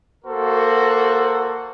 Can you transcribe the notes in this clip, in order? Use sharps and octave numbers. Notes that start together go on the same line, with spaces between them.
A#3 F#4 A4 C5